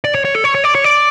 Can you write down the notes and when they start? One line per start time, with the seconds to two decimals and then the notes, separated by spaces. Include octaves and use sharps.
0.04 D5
0.15 C#5
0.25 C#5
0.35 A4
0.44 C#5
0.55 C#5
0.64 D5
0.75 C#5
0.84 D5